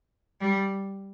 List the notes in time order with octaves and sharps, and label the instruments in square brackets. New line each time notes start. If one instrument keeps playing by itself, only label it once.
[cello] G3